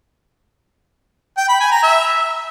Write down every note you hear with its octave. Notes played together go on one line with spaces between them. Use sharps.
G5
B5
G#5
A#5
E5